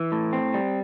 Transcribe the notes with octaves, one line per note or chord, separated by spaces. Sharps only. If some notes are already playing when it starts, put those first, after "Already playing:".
Already playing: E3
A2
C4
G3